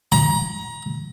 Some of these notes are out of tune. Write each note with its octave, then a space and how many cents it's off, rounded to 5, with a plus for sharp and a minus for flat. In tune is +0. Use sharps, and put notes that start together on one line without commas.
A#5 +30